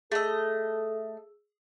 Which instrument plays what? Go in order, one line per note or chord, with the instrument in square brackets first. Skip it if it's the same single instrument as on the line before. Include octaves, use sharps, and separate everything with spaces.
[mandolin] A3 D#5 [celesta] G#4 E6 [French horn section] A4